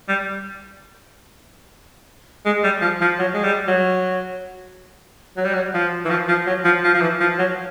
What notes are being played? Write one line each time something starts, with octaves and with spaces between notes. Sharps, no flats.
G3
G#3
G3
F3
F3
F#3
G#3
G3
F#3
F#3
G3
F#3
F3
E3
F3
F3
F#3
F3
F3
F3
E3
F3
F#3